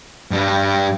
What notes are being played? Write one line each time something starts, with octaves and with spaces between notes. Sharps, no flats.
G2 G3